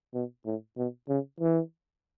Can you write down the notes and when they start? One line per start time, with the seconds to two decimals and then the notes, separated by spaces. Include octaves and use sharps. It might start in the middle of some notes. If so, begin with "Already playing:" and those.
0.14 B2
0.46 A2
0.77 B2
1.09 C#3
1.41 E3